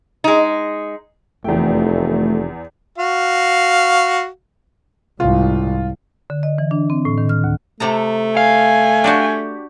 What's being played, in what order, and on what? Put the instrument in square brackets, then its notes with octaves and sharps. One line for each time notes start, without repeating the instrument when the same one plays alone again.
[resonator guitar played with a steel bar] G#3 D#4
[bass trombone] F1 [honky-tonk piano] E2 G5 [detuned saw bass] A3
[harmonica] F#4 F5
[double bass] C2 G#2 [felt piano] F4
[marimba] D3
D#5
E3
D4
C4
A2
D#3
F6
D2
[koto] C3 A4 A#5 [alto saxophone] A3
[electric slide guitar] F5 [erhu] G#5
[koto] D4 F#4 G4